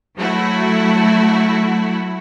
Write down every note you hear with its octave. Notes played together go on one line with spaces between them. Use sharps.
F#3 A3 E4 F#4